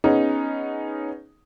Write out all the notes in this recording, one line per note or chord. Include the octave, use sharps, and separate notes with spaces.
B3 C#4 D#4 G#4